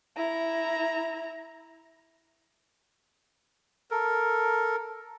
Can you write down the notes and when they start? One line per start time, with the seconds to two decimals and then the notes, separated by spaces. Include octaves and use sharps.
0.17 E4 A#5
3.91 A4 A#4